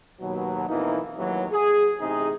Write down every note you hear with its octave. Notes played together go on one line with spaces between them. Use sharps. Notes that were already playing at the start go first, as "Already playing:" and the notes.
D#2 B2 F#3
F2 B2 E3 A#3 D#4 E4
A1 D#2 E3 F#3
G#4
A1 C3 C4 D#4 G#4